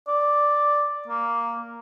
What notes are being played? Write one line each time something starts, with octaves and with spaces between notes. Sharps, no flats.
D5
A#3